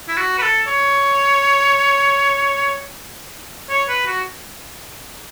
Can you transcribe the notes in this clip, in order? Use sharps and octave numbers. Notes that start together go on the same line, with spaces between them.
E4
F#4
B4
A4
C#5
C#5
B4
F#4